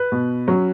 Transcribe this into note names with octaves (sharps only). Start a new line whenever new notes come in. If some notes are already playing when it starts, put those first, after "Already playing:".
Already playing: B4
B2
F#3 C#4